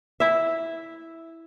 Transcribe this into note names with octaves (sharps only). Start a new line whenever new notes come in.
E4 E5